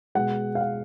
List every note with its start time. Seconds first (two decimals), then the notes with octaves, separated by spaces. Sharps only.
0.15 B2 G#3 F#5
0.55 F5
0.61 F#5